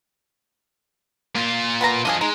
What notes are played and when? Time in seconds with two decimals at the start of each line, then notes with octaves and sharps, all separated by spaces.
1.35 A#2 F4
1.81 B3 B4 A#5
2.05 F3 D4 F4 G#4 D#5
2.21 G#3 D#4